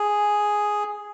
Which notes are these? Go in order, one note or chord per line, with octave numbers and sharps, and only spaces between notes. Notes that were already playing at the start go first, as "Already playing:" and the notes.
Already playing: G#4